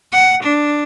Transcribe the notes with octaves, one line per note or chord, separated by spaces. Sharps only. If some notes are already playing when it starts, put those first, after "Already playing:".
F#5
D4